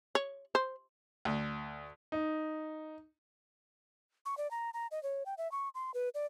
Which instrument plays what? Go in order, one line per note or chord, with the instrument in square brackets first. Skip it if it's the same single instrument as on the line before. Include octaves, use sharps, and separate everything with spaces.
[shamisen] C#5
C5
[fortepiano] D2
[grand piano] D#4
[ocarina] C#6
D5
A#5
A#5
D#5
C#5
G5
E5
C#6
C6
B4
D5